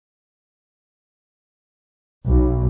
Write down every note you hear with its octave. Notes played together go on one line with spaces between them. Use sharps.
B1